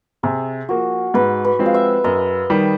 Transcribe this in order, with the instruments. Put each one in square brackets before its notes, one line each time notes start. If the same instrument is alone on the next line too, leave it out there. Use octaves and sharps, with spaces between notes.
[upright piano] C3 [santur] G#4
[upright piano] F3 A#3 [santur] F#4
[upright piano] G#2 [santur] B4
[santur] B4
[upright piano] F3 G#3 C4
[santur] F5
E5
[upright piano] F#2 [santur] D#5
[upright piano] D#3 G3